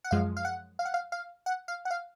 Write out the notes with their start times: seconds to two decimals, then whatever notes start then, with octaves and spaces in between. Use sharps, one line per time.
0.04 F#5
0.11 F#2 F3 G#3 F5
0.37 F5
0.45 F#5
0.79 F5
0.85 F#5
0.94 F5
1.12 F5
1.46 F#5
1.68 F5
1.85 F#5
1.91 F5